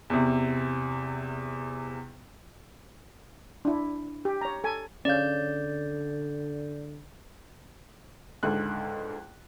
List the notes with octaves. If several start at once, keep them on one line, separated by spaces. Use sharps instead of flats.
E2 C3
D4 E4
G4
C#5 A#5
A4 G#5
D3 C#4 D5 F5 G6
C#2 G#2 D3 F#6